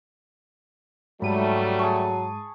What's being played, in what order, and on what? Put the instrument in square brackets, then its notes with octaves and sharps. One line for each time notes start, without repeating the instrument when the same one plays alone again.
[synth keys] G#2 D#7 [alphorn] F#3 [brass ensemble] G3 A3 [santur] B5
[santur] G#4 A5 C#6